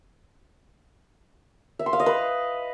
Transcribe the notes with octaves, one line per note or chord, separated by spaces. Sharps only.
E5
C6
F5
D#5
B4